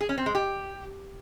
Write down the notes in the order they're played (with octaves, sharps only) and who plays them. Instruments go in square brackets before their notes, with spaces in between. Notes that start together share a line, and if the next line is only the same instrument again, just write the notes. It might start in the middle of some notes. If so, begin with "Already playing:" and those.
[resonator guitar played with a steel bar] G#4
C#4
C4
G#3
G4